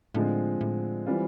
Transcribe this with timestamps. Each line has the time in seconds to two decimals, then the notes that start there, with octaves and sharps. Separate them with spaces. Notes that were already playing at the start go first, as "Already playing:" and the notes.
0.14 A2 D3 F3 G#3 C4
0.61 A2
1.06 E3 G3 C4 F4